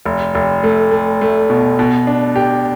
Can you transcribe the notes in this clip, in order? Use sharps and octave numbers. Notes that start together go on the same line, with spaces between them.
F1
F1
A3
A3
A3
B2
B2
D4
G4